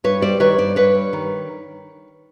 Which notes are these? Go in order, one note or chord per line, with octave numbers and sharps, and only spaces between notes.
G2 B4 C#5
G3 C5 D5
D#3 B4 C#5
G2 C5 D5
G2 B4 C#5
G3
D#3